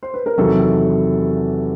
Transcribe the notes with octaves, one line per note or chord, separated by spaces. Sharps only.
C5
B4
A#4
E2 C3 D#3 F#3 A4